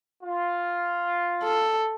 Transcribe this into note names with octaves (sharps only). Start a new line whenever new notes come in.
F4
A4